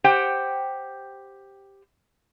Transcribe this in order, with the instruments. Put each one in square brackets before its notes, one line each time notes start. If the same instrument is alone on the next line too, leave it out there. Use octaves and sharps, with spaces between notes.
[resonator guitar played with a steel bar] G4 C5 F#5 G5